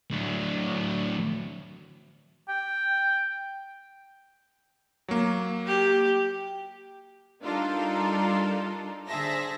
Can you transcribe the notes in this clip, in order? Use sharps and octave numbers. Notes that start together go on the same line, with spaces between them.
D2 F#3
G5
F#3 A#3
G4
G3 D4 D#4 F4 A4 A#4
D3 G#4 C5 E5 A5 A#6